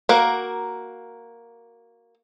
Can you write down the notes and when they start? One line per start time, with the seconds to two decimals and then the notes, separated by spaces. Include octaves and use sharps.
0.09 A#3 F#4 A#4